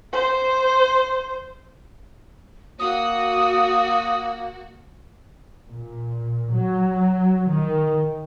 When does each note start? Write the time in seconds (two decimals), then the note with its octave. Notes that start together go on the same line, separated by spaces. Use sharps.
0.13 C5
2.80 A#3 F#4 D#6
5.69 A#2
6.52 F#3
7.51 D#3